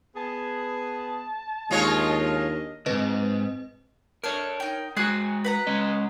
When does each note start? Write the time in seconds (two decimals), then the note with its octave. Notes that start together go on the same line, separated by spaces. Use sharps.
0.16 B3 G#4 A5
1.71 D#2 G#3 D4 F4 A#4 C#5 D#5
2.86 C#2 G#2 C4 B4 D#5
4.24 D4 A4 A#4 C#5 F6
4.60 D#4 G5
4.96 G#3 F#4 G#4 G#5 F#6
5.44 B4 F#5 A#5
5.67 G#3 C#4 D#5